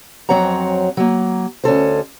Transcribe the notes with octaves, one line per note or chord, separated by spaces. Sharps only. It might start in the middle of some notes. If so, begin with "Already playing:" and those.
F2 F#3 C4 C#5 F#5 A#5
F#3 A#3
D2 C#4 A4 C5